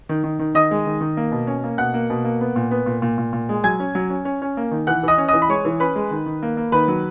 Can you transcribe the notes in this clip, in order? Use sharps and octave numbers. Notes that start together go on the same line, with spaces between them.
D#3
D#3
D#3
D#3 D#5 D#6
G#3
D#3
D#3
A#3
B2
C#4
A#3
B2 F#5 F#6
A#3
B2
A#3
B3
A#2
B3
A#2
A#2
A#2
A#2
G#3
F#3 G#5 G#6
C#4
F#3
C#4
C#4
C#4
A#3
D#3
E3 F#5 F#6
E3 D#5 D#6
C#4
E3 D#5 D#6
B5
G#3 C#5 C#6
E3
C#4 B4 B5
G#3
D#3
D#3
A#3
A#3
D#3 B4 B5
F#3